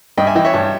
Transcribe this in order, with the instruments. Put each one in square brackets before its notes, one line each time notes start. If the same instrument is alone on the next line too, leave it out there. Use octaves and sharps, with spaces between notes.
[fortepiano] G2 D#5 G5
E5 G#5
E3 D#5 G5
C#5 E5
G2